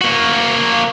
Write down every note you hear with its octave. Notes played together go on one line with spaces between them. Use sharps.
A#3 F#4